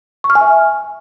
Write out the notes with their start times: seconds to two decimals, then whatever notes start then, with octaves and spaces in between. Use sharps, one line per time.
0.24 C#6
0.30 F6
0.35 G#5
0.41 E5